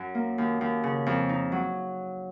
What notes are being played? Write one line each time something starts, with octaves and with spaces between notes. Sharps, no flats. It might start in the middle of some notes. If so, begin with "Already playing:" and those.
Already playing: F#2
A#3
D#2
D#2
C#3
F2
D#4
F#3